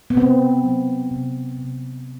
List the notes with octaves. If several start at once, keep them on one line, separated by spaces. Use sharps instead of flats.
B3
C3 C4
F#3
C3
C3